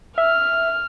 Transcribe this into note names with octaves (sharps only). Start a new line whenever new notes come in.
E5 F6